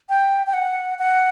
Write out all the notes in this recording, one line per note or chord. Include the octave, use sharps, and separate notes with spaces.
G5
G5
F#5
F#5